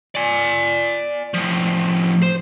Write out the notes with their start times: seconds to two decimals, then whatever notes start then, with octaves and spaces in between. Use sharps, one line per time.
0.15 D5 G#5
1.34 A2 F3
2.22 C5